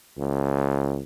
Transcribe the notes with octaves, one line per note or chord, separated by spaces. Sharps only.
C#2